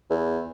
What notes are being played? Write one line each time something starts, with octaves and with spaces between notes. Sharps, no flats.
E2